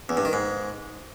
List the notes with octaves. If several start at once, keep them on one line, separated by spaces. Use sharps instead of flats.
E2
G2
D#3
G#2